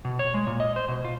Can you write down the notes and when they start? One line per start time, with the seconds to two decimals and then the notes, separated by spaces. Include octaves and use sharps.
0.05 B2
0.19 C#5
0.34 G#3
0.47 A#2
0.60 D#5
0.76 C5
0.88 B2
1.05 F4